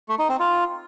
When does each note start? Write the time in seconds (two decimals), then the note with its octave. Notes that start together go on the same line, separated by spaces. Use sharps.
0.09 A3
0.19 D#4
0.29 C4
0.40 F4